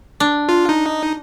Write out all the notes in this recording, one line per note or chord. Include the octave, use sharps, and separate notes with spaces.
D4
F4
D#4